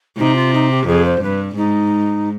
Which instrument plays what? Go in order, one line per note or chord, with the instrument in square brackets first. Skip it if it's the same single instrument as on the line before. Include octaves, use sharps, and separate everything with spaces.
[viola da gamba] C3 [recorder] D#4
[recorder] F4
D#4
G4
[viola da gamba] F2 [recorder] G#4
[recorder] C5
[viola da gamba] G2 [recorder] B4
[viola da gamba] G#2 [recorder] D#4